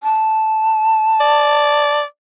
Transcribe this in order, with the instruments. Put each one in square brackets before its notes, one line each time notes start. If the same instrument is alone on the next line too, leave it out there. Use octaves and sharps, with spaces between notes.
[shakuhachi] A5
[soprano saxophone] D5